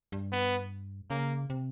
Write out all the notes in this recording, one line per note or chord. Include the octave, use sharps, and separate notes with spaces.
G2
B3
C#3 A#3
C3